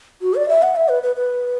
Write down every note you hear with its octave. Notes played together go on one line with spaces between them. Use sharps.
F#4
D5
E5
F#5
E5
B4
B4
B4